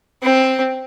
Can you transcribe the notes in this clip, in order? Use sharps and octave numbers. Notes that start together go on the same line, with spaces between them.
C4